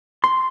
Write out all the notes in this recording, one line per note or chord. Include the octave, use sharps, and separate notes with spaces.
C6